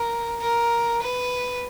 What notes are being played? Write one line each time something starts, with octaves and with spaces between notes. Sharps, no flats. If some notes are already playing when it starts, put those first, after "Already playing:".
Already playing: A#4
A#4
B4